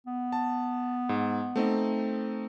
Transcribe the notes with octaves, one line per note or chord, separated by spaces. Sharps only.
B3
A5
G#2
A3 C4 D#4